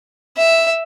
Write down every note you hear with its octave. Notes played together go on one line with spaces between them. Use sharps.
E5